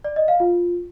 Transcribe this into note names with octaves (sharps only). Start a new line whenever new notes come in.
D5
D#5
F5
F4